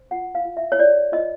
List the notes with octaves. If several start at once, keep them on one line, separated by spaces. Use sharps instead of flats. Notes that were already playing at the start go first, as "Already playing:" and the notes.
Already playing: C5
F4 F#5
F5
F4
E5
C#5
F4 D5
F4 D#5